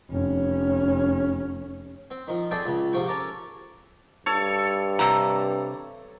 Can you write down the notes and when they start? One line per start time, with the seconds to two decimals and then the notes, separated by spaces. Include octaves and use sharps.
0.11 F1 C#4
2.11 C4
2.28 D#3 F3
2.51 A3 C4 G#4 A4 D5 G5
2.66 C#2 C#3
2.93 G#2 C3 F3 G5 C#6
3.07 C#4 A4 A#4 D6
4.26 G2 A4 C#5
4.99 C3 A#5